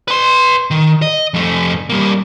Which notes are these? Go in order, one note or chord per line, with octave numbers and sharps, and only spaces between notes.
B4 C6
D#3
D#5
F2 A3
G3 A#3